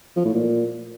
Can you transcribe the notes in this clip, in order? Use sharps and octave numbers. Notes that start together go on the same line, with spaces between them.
F3
A2
A#2